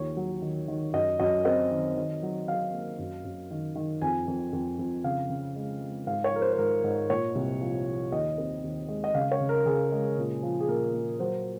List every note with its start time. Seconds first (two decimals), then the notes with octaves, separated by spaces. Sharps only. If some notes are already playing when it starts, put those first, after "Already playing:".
Already playing: D#2 F3 C#5
0.17 F#3
0.42 D#3
0.68 D#3
0.93 F#2 D#5
1.19 F#2 D#5
1.45 C4 D#5
1.71 D#3
1.97 D#3
2.23 F#3
2.48 F#3 F5
2.74 A#3
2.99 F#2
3.25 F#2
3.51 D#3
3.76 D#3
4.02 F2 G#5
4.28 F2
4.53 F2
4.79 F2
5.04 C#3 F5
5.30 C#3
5.56 G#3
5.81 G#3
6.07 G#2 F5
6.24 C#5
6.32 F3 A#4
6.42 C5
6.53 C5
6.58 G#2 A#4
6.84 G#2
7.10 A#2 C#5
7.35 C2
7.61 F3
7.86 F3
8.12 D#2 D#5
8.38 C4
8.64 D#2
8.89 G#3
9.04 D#5
9.14 C#3 F5
9.32 C#5
9.40 C#3
9.49 A#4
9.66 C#3 G#4
9.92 G#3
10.18 A#2
10.43 F3
10.60 G#4
10.69 A#2 A#4
10.94 A#3
11.20 F#3 C5